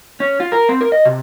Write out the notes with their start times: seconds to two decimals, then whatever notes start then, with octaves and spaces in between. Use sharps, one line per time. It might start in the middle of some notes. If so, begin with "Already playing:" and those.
0.20 C#4
0.40 F4
0.52 A#4
0.69 C4
0.81 A#4
0.92 D#5
1.05 C3